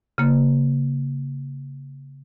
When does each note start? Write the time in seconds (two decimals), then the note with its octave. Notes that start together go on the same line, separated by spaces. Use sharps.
0.18 C#3 A#3